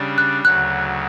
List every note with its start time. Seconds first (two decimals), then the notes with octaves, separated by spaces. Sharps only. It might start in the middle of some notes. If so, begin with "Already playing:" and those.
Already playing: C#3 G3 D4
0.18 F#6
0.45 D2 C#3 F#3 F#6